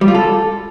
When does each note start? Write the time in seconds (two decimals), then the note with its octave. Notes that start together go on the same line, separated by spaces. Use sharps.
0.01 G3
0.08 F4
0.14 A4